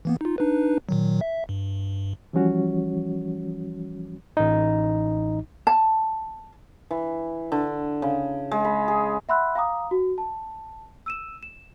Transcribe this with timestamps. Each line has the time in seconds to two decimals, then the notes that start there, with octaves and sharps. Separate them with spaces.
0.05 E3 A#3 B3
0.21 D#4 F4
0.38 D4 D#4 B4
0.89 A#2 D#3 F#3
1.21 E5
1.49 G2
2.33 E3 F3 G3 C#4 F#4 C#5
4.37 A1 D#4
5.67 A5
6.91 E3
7.52 D3
8.02 C#3
8.51 G#3
8.65 B5
8.88 G#4
9.29 E5 F#5 B5 C6 E6 F#6
9.55 F5 G5 A#5 D6 D#6
9.91 F#4
10.18 A5
11.06 E6 D#7 E7
11.43 E7